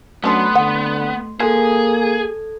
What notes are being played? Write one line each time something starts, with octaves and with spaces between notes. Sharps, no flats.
F#3 A3 B3 C#4 D4 A4 C6
D3 F#5
G#3 A#3 G#4 A4 G#6